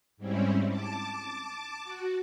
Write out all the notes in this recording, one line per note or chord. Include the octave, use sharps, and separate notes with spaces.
G#2 G3 C4 C#4 E4
A5 D6
F#4